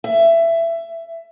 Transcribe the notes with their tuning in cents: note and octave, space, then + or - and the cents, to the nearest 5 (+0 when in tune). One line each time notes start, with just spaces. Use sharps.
E5 +20